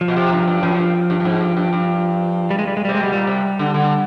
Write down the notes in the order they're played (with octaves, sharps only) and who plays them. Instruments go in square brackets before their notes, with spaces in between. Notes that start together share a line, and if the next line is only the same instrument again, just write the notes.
[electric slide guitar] F3
[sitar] B2
C3
G2
G2
[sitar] F#2 [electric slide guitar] F3
[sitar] G2
G2
G2
G#2
G2
G2
G2
[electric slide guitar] G3
G#3
G3
G#3
G3
[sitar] C3
[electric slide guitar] G#3
[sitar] B2 [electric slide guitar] G3
[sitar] A#2 [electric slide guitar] G3
[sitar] C3
D3
D3